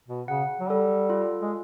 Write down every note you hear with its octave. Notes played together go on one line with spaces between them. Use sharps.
B2
C#3 F#5
F#3
G3 A4
F4
G#3